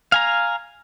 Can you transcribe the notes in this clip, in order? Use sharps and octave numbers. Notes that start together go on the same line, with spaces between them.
F5 G#5 A#5